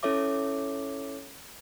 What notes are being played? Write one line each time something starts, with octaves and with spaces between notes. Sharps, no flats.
C#4 E4 A4 C#5 E5 D6